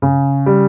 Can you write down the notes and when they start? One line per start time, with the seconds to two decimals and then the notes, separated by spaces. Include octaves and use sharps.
0.02 C#3
0.46 G3